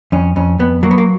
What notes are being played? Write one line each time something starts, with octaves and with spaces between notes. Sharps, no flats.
F2 C#4
F2 C#4
F2 B3
F#3 A#3
B3
A#3